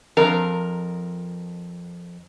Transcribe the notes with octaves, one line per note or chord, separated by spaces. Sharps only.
F2 A#4